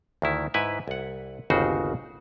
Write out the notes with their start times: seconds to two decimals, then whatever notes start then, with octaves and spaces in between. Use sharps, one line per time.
0.22 D2 D#3 E4
0.54 G#2 E4 B4 G#5
0.88 C2 F#5
1.50 G1 D#2 C#3 D#4 F#4 C5